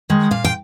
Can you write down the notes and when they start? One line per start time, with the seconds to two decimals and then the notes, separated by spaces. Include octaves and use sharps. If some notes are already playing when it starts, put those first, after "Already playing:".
0.10 D#3 G#3
0.31 A#2 F5
0.44 G5